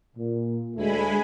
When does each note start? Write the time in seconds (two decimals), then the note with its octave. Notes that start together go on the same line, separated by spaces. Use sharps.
0.17 A#2
0.76 D2 G#3 A3 G#5 B5